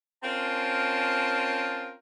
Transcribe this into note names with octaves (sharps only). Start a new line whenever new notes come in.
C4 C#4 F4 A#4 A5